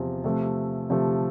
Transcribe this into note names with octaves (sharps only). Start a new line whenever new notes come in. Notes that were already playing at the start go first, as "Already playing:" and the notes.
Already playing: E2 C3 F3
C3 F3 A3
C3 F3 A3